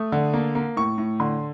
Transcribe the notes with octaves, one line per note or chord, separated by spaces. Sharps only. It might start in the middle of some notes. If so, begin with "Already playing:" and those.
Already playing: A3 D#6
D3
A#3
A#3
A2 C#6
A2
D3 C6